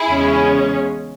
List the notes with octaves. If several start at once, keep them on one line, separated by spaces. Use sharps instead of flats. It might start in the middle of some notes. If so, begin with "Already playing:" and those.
Already playing: E4 G#4
E2 C#3 G#3 C#4